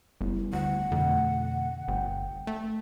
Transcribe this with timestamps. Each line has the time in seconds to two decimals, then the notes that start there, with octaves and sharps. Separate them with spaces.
0.21 F#1 G3 B3 E4
0.53 D2 F#5
0.92 F2 B2 D3 A3
1.88 G1 G5
2.47 A3